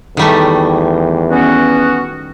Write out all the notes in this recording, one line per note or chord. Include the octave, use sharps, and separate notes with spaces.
E2 D#3 G3 A3
B3 C#4 F#4